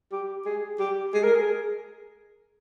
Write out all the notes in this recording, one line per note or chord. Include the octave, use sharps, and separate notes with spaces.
G4
G#4
G4
G#4
A#4
G#4